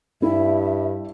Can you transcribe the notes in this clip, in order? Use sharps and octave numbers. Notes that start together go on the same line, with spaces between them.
G2 E4 E5